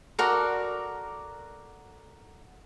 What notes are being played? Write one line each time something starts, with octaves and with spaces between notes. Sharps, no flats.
F#4 A4 A#4 D5